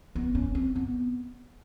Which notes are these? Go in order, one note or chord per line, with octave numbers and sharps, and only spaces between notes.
B3
C#4
C4
B3